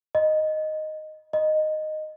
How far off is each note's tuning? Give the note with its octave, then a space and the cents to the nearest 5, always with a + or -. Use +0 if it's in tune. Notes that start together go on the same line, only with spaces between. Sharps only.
D#5 -5
D#5 -10